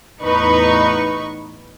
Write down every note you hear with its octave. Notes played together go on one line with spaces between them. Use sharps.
E2 A2 D#4 B4 C#6